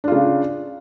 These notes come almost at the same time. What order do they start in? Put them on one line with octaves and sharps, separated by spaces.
D4 F4 C#3